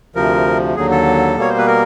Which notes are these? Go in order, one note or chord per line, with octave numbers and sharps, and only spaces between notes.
D2 C3 F3 A#4
D#2 D3 F#3 G#4
A4
B2 G3 A#3 C#5
C5
B4
A#4